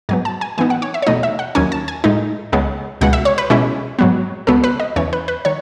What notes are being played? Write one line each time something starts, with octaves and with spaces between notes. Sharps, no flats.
G#2 F#3 B3 G#5
A5
G#5
A2 E3 B3 D#4 G#5
F#5
C#5
E5
C#5
E2 B2 A3 D#4 D#5
E5
F#5
D#2 D#3 F#3 C#4 G#5
A5
G#5
A2 G#3 D#4
C#2 C#3 G#3 B3
C#2 B2 G#3 F#5
E5
C#5
B4
B2 G#3 C#4 E4
G#2 F#3 B3
C#2 B2 F#3 B3 A4
B4
D#5
E2 C#3 E3 C#5
B4
B4
D#3 C#5